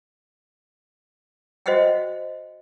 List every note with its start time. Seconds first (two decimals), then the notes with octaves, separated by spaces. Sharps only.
1.66 F#4 C5 D#5 E5 F#5 G5